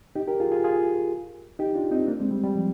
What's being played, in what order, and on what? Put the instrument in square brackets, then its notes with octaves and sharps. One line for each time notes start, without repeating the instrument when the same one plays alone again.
[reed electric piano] D#4 G4
G4 A#4
F4 G#4
F4 G#4
F4 G#4
D#4 G4
D4 F4
C4 D#4
A#3 D4
G#3 C4
G3
G3
F3